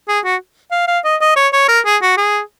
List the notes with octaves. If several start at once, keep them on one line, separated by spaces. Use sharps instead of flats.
G#4
F#4
F5
F5
D#5
D#5
C#5
C#5
A#4
G#4
F#4
G#4